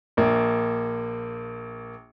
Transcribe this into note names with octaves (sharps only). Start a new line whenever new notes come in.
A#1 A#3